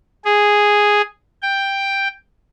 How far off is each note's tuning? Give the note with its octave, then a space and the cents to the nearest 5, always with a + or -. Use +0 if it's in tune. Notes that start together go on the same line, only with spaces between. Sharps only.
G#4 -5
G5 +5